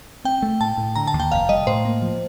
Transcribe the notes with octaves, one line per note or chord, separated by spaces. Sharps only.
C4 G5
A3
A2 A5
A2
D3 A#5
A5
D#2
G5
F1 F5
G3 D#5
A2 C5
A#3
F3